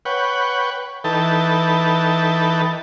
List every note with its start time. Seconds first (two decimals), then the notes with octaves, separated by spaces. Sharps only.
0.05 B4 C#5 F#5 G5
1.04 E3 D#4 A4 B4 G5 A5